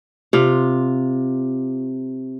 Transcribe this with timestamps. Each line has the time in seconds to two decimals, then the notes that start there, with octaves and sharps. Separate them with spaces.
0.33 C3 F4